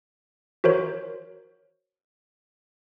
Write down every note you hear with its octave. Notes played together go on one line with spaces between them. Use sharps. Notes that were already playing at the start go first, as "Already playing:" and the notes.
F#4 A#4 C5 C#5